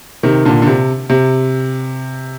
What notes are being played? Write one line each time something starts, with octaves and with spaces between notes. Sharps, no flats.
C3 D#3
A#2 D3
D3
C3
C3